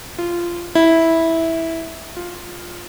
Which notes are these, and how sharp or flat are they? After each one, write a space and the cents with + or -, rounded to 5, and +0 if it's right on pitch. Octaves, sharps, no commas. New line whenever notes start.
F4 -15
E4 -10
F4 +10